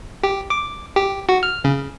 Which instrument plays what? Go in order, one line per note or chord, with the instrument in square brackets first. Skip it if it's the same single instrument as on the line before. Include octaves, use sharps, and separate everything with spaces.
[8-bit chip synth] G4
D6
G4
F#4
F6
C#3